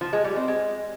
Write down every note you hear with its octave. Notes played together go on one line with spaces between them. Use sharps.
F3
G#3
G3
C4
G#3